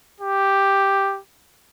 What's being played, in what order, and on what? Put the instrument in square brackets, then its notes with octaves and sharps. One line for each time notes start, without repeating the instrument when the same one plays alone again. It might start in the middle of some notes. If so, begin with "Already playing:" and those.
[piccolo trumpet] G4